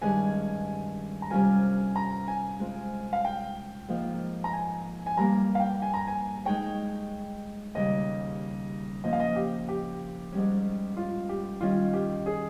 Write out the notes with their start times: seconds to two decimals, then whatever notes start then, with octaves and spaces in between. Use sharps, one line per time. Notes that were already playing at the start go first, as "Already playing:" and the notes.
0.02 G2 D#3 G#3 C#4 G#4 G#5
1.22 A#5
1.30 C3 G3 C#4 F4 A#4 G#5
1.96 A#5
2.28 G#5
2.60 G#3 C4 F4
3.13 F5
3.25 G5
3.89 G#2 F3 A#3 F4
4.44 A#5
4.53 G#5
5.06 G#5
5.17 G2 G3 A#3 A#5
5.55 F5
5.60 G5
5.82 G#5
5.94 A#5
6.07 G#5
6.45 G#3 D#4 G#4 C#5 G5
7.75 D#2 C#3 G3 D#5
9.04 A#2 F3 A#3 C#4 D#5
9.13 F5
9.20 D#5
9.36 G4
9.68 G4
10.32 G#2 G3 C#4
10.97 F4
11.29 G4
11.61 D#3 G3 C#4 F4
11.93 G4
12.26 G#4